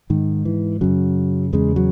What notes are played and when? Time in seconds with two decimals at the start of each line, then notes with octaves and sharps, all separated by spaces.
0.10 G#2 D#3
0.45 E3
0.81 F#2 C#3 F#3
1.53 E2 C#3 G#3
1.76 F#3